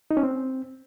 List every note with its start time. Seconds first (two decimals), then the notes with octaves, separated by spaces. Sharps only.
0.11 D#4
0.17 C#4
0.23 C4